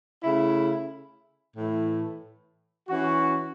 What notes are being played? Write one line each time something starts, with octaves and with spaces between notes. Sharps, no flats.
C#3 A3 E4
A2 E3 A3 E4
E3 C#4 F#4